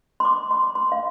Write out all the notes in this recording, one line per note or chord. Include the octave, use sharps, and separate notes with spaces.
C6
D6
C6
C6
F5